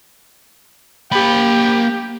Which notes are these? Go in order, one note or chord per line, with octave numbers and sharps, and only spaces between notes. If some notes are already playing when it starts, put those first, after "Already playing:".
A#3 G4 B5